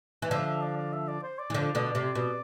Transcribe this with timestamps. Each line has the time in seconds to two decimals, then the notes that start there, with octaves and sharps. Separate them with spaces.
0.22 E3
0.31 D3 F3 E5
0.47 E5
0.62 D5
0.77 D5
0.93 E5
1.08 D5
1.23 C5
1.39 D5
1.50 E3
1.54 D3 F3
1.75 B2 D3
1.95 C3
2.15 B2